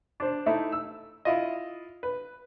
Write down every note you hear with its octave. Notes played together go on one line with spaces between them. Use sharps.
D4 C5
A3 D#4 E4
E6
E4 F4 D#5
B4